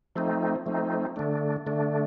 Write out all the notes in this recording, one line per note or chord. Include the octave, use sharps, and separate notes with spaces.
F3 A3 C4 D#4
F3 A3 C4 D#4
D3 A3 D4
D3 A3 D4